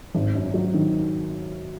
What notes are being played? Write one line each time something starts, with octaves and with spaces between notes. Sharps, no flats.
G#1
F#2
F#3
D#3